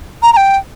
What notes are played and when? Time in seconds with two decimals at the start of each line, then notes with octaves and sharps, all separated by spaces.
0.23 A#5
0.33 A#5
0.37 G5